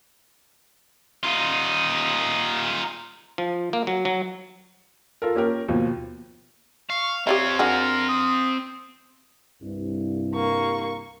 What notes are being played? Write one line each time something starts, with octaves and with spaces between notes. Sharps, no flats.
D#4 F4
F3
A#3
F#3
F#3
F4 A4 A#4
A#3 C#4 G4 A#4
D#2 B2 F3
F5 C#6
C4 G4 C#5 D5 E5 F5
D4 F#4 G#4 A#4
D#6
C2 G2
A#3 C#6